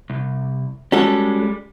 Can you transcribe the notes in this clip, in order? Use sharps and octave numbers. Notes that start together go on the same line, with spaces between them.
C2
G3 G#3 C#4 F#4 A4